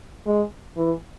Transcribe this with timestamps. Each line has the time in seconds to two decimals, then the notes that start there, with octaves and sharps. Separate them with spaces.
0.27 G#3
0.77 E3